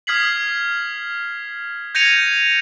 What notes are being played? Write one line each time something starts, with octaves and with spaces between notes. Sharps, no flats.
D#6 F6 G#6 B6 C7 F#7
G6 G#6 A#6 C#7 D#7 F7